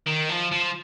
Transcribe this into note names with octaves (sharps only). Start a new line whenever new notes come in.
D#3
F3
F3